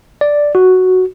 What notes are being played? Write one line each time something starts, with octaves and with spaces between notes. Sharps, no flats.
D5
F#4